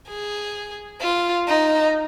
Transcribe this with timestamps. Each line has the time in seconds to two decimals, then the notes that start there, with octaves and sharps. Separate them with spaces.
0.09 G#4
1.01 F4
1.48 D#4